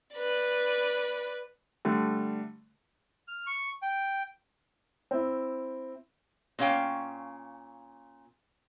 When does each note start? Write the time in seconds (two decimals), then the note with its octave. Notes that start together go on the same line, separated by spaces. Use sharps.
0.15 B4 D5
1.85 D3 G3 A3
3.28 F6
3.46 C#6
3.82 G5
5.11 C4 E4
6.59 A#2 C#4 F5 G5